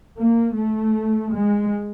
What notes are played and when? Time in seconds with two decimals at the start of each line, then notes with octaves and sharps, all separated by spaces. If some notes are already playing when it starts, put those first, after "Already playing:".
0.18 A#3
0.57 A3
1.34 G#3